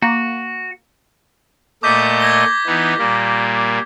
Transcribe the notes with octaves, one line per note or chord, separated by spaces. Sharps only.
A#3 F#4
A#2 A3 D#5 D6 G6 B6
G#6 A#6 G7
E3 B3 D#4
A#2 G3 A#3